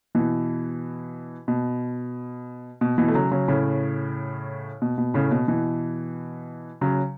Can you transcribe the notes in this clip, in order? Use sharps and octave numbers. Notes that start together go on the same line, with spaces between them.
B2 E3
B2
B2
B2 E3
A3
C#3 F#3
C#3 F#3
A2 C#3
B2
B2
A2 C#3
B2
B2 E3
C#3 F#3